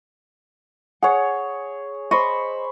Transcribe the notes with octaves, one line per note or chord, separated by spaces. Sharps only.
G#4 C#5 F#5
C5 D#5 B5 C#6